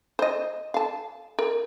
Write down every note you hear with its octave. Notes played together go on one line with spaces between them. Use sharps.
C5 D#5
F5 A5
A#4